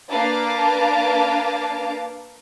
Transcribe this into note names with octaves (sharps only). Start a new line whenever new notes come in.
A#3 D4 B4 F5 A5 D6